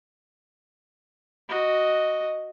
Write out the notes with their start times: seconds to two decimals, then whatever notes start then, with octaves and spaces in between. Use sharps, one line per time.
1.49 F#4 D#5